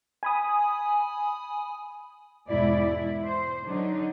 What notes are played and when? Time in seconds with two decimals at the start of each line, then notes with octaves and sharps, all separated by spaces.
0.23 G#5 B5 D#6
2.49 E2 G#2 B2 G#3 E4 D5
2.80 E4
3.24 C5
3.65 D3 F#3 D4 D#4